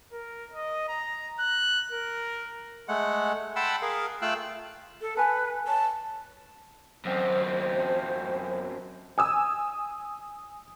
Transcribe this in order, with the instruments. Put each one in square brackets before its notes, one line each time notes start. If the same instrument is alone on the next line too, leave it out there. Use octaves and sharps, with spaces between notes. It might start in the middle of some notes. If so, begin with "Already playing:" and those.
[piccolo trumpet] A#4
D#5
A#5
F#6
A#4
[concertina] G#3 A3 F#5
F#5 G5 A5 B5 C6 E6
G#4 A#4 F5
A3 F4 F5 G5 E6 F#6
[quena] A4
[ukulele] A4 G#5 A5 [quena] B4
[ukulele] C#5 [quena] A5
[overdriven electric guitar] F#2 C4 [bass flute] C5
[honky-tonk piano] G#5 D#6 E6